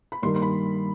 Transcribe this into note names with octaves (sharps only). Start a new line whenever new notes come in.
B5
G2 D#3 G3 A#3 C6
C6
B5